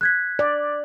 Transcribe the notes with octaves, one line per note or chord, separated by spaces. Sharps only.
F#6 G#6 B6
D5